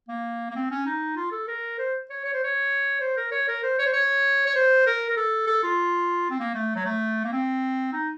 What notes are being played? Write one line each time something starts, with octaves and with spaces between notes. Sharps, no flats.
A#3
A#3
C4
C#4
D#4
F4
A4
A#4
C5
C#5
C#5
C5
C#5
C5
A#4
C#5
A#4
C5
C#5
C5
C#5
C#5
C5
A#4
A#4
A4
A4
F4
C4
A#3
A3
F#3
A3
A#3
C4
D#4